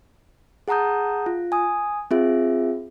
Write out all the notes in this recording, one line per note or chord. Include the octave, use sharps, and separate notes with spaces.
G#4 F#5 A5 A#5 D#6 G6
F4
G#5 D#6
C4 F4 G#4 E5